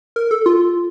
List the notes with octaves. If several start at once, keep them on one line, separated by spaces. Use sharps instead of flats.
A#4
A4
F4